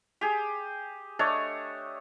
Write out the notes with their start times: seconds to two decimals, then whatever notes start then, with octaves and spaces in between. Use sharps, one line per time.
0.21 G4 G#4
1.19 A3 D4 C#5 D#5